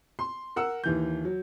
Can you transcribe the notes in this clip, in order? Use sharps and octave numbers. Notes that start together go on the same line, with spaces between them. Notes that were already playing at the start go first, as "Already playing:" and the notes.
C6
A#4 F#5 E6
D#2 E3 G6
F#3